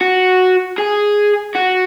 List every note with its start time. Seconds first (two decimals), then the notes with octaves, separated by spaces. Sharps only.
0.01 F#4
0.78 G#4
1.55 F#4